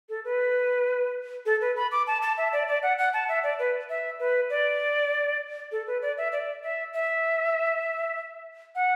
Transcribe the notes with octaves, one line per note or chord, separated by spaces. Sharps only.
A4
B4
A4
B4
B5
D6
A5
A5
E5
D5
D5
F#5
F#5
A5
E5
D5
B4
E5
B4
D5
A4
B4
D5
E5
D5
E5
E5
F#5